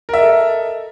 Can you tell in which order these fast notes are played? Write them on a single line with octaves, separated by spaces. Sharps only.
A#4 E5 D#5 A4